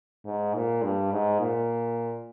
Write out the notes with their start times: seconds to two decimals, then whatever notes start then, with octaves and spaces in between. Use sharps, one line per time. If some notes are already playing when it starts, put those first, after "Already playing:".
0.25 G#2
0.54 A#2
0.83 G2
1.11 G#2
1.40 A#2